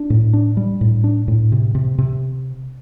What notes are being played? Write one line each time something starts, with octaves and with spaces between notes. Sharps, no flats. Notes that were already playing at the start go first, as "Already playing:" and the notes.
Already playing: D4
A2
D4
G3
A2
D4
A2
C3
C3
C3